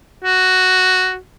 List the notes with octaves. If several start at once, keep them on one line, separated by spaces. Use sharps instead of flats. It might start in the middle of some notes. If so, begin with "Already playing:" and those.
F#4